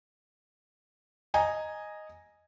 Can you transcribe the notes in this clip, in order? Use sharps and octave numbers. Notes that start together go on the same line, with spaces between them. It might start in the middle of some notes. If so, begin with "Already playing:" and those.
D#5 G#5 A#5